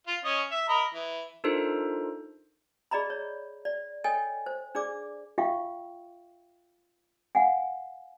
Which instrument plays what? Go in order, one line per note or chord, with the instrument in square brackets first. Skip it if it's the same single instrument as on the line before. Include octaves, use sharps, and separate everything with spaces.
[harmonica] F4
C#4 D#5
E5
A#4 D#5 B5
E3
[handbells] D4 D#4 F4 A4 A#4 C5
[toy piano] G#4 D5 D#5 A#5 B5
C#5
D5
A4 C#5 D#5 G5 G#5
C5
D4 G#4 D5 D6
F4 E5 F5 G5 C#6
F5 F#5 G#5